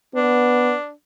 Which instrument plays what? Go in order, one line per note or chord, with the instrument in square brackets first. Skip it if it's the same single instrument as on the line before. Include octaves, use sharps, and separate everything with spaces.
[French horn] B3 [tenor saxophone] D4